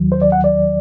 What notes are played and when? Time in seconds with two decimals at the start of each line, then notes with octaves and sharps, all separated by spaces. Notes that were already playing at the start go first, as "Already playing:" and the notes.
Already playing: D#2 D#3 F#3
0.12 C5
0.22 D5
0.32 F#5
0.44 D5